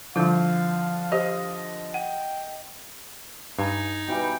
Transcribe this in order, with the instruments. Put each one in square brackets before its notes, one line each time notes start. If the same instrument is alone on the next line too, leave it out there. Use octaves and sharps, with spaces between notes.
[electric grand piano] D3 F3 G6 [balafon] G3 E4 [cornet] F5
[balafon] G4 C5 [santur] D#5
[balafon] F#5 [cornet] G5
[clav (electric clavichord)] G2 [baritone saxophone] D#4 [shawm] G#5
[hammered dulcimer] B2 E3 G3 [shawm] G5